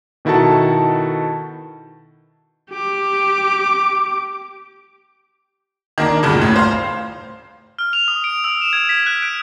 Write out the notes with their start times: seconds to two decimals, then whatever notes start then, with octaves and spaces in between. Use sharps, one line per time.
0.25 B2 D#3 E4 F#4 A4 A5
2.70 G4 D6
5.98 D#3 A#3 D4
6.23 D2 G2 A#2 C#3
6.42 A2
6.56 C5 F5
7.79 F6
7.93 F7
8.08 D#6
8.24 D7
8.44 E6
8.61 E7
8.73 G#6
8.89 B6
9.06 F#6
9.22 D7